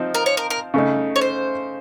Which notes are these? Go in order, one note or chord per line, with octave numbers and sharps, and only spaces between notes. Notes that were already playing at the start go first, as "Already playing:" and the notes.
Already playing: F3 C4 D#4
A#4
C#5
A#4
A#4
C#3 A3 D#4
C#5
C5